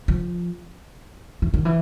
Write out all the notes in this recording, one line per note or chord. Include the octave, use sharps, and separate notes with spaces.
F3
E3
D#3
E3